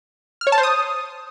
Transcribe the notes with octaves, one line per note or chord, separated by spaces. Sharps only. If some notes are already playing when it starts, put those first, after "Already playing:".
F6
C#5
A5
C5
D#6